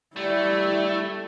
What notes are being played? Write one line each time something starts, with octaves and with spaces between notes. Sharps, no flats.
G3 A3 E4